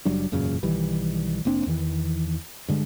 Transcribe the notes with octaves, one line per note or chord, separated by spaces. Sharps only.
F#1 F#3 G3 D4
E1 F#2 A#2 C#3
B1 D#3 E3 G3
F1 A#3 C4 D4
E2 D#3 E3
G2 D3 G#3